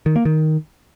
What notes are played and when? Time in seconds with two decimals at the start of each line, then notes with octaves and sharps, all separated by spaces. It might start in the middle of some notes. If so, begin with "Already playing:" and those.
0.06 D#3
0.16 A#3
0.25 D#3